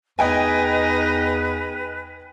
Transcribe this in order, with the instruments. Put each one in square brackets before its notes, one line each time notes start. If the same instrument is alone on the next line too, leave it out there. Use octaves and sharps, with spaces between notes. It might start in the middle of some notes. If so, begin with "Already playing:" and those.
[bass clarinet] E2 [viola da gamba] D#4 [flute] B4 [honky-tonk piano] D#5 G5 G#5